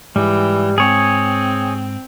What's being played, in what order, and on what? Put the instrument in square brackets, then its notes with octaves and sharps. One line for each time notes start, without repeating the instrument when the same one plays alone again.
[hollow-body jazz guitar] G#2 [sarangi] E3 [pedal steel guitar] G3
[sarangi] C4 [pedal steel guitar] G#4 C#5